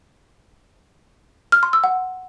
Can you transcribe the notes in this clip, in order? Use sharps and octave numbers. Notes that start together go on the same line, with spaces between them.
F6
C6
E6
F#5